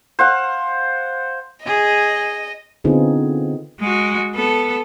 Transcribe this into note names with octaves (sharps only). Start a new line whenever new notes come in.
C5 F5 F#5
G#4 D#5
D3 B3 C4 D#4 F4 G#4
G#3 F#4
B3 A4